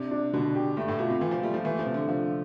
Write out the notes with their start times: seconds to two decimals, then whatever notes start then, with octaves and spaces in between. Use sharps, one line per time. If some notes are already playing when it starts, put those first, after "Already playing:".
Already playing: C3 D4
0.11 D4
0.33 B2 D3
0.55 G4
0.77 G2 A3
0.88 A2
0.99 B2 F4
1.10 C3
1.21 E3 F4
1.31 F3
1.43 G3 A3
1.54 F3
1.64 E3 A3
1.79 F3
1.86 C3
1.94 D3
2.08 D3 F3